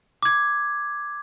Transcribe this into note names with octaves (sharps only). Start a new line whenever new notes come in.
D6 G#6